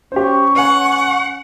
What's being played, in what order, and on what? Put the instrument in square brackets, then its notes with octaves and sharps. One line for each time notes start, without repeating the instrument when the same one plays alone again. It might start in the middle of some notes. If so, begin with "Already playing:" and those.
[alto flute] C#4 [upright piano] G4 C5 [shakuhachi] C#6
[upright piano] B4 G#5 [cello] F#5